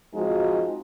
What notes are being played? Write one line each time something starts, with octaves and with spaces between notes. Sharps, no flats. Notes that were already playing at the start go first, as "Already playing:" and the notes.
F3 G#3 C4 D#4 F4 F#4